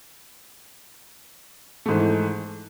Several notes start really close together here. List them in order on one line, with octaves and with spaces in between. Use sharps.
A3 G#2 E3